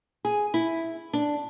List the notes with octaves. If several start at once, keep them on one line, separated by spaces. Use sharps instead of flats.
G#4
E4
D4